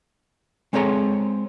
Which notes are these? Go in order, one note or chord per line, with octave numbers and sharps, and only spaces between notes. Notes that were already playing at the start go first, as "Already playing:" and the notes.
G#3 C4 A4 C#5 A#5